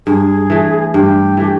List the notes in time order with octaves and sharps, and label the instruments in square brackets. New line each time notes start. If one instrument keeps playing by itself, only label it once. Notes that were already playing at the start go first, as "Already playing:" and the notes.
[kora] G2 [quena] G#4
[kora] E3 A3
[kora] G2 [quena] G4
[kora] E3 A3